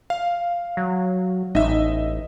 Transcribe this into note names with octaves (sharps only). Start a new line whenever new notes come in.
F5
F#3
A1 D#4 D#5 E5